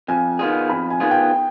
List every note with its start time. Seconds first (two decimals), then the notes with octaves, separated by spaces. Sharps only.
0.08 F2 G#5
0.39 D#3 B3 F4 G#4
0.70 F2 B5
0.90 G#5
1.00 D#3 B3 F4 G#4
1.11 G5